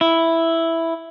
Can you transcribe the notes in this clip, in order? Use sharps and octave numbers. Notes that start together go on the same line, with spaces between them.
E4